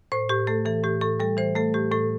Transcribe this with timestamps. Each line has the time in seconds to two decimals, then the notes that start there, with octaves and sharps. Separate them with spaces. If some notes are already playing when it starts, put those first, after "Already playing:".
0.12 A2 C5
0.29 A2 G4
0.47 A3 A4
0.65 E3 A4
0.84 A2 G4
1.01 A2 A4
1.20 G3 A4
1.37 E3 C5
1.55 A3 A4
1.74 A2 G4
1.92 A2 A4